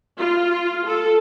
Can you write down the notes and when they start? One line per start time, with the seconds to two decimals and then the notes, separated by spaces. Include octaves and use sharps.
0.18 F4
0.86 A4